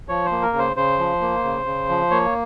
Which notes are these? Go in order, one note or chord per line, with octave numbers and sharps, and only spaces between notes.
F3 C#5
C5
A#3
A#4
C#3
C5
C#3 C5
F3
A#3
C#3
C#3
F3
A#3 C#5